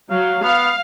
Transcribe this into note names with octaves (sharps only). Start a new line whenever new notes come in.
F#3 F5
B3 F5